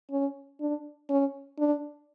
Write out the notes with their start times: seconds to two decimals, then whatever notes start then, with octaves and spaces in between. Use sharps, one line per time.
0.11 C#4
0.60 D4
1.10 C#4
1.59 D4